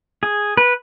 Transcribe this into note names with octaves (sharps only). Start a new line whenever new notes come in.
G#4
B4